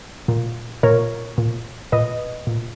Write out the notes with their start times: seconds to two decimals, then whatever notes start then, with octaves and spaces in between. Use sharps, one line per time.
0.28 A#2
0.83 A#2 A#4 C#5
1.38 A#2
1.92 A#2 B4 D#5
2.47 A#2